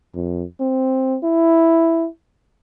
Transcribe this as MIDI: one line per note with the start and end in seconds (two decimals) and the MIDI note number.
0.15 0.43 41
0.60 1.17 60
1.23 2.07 64